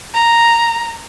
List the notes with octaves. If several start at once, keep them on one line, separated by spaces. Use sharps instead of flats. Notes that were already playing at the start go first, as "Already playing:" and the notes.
A#5